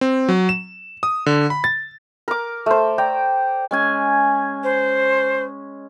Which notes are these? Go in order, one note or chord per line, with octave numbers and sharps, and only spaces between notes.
C4
F#3
E7
D#6
D3
B5
A6
A#4 D6
A3 C5
D5 G5 A#5
G#3 C#4 G#5
C5